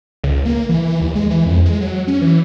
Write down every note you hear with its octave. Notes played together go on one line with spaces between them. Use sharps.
C#2
A#3
E3
E3
D#2
G#3
E3
F2
G#3
F#3
C#4
E3